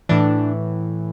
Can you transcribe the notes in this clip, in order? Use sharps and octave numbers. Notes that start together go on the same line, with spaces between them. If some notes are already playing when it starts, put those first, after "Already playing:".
A2 E3 D4